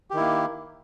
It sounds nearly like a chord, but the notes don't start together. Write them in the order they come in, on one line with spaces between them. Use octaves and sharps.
G4 D#3 E4 A#3